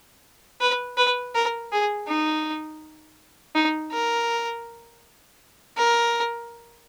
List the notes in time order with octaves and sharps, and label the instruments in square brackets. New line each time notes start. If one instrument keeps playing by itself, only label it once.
[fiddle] B4
B4
A#4
G#4
D#4
D#4
A#4
A#4